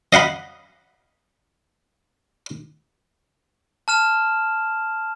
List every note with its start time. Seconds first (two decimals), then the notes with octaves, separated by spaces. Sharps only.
0.13 D#5 F5 F#5 B5
3.88 A5 F6 E7